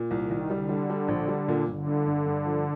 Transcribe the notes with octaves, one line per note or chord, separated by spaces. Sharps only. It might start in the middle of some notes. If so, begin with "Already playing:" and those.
Already playing: A#2
C2
D#3
C2
D3 G3
G3
G3
A#1
G3
A#2
G1 D3
G2
G2
G2
F3